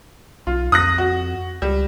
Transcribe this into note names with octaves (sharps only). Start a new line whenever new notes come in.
B1 F4
F2 D#6 F#6 A#6
F#4
C#2 G3